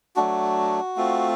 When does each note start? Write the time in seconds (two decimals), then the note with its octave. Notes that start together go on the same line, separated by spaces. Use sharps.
0.16 F#3 A3 D4 F#4
0.97 A3 C4 F4